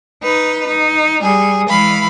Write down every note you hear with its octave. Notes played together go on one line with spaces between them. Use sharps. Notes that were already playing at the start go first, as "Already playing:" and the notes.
D#4 B4
D#4
G3 G#4
E3 G#3 F5 B5